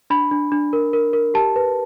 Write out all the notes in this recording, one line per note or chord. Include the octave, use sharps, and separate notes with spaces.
D4 B5
D4
D4
A#4
A#4
A#4
G4 A5
B4